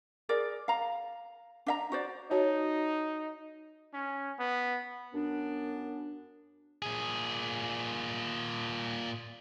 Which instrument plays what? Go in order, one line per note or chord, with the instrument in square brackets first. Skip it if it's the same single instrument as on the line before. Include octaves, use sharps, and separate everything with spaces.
[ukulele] G#4 A#4 D5
F5 A#5
D4 E5 A#5
F#4 C5 D5
[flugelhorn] D#4 [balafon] F#4 C#5 A5
[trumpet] C#4
B3
[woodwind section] F#2 B3 D4
[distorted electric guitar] A#2 G#4